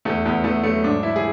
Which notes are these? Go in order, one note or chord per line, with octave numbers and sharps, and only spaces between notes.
E2 A3
E2 B3
E2 A3
F#3 A3
G#2 D4
E3 E4
G#4